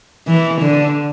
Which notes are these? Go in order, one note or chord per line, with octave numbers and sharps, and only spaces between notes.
E3
D3